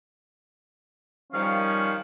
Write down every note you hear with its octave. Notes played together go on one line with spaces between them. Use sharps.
D#3 F3 G3 C#4 F5